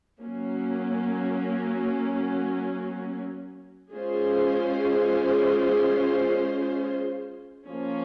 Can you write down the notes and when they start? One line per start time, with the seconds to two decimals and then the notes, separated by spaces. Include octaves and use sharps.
0.21 F#3 A#3 C#4
3.94 G#3 C#4 F4 G#4 C5
7.67 F3 A#3 C#4